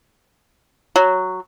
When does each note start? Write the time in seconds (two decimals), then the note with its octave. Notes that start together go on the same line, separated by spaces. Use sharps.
0.96 F#3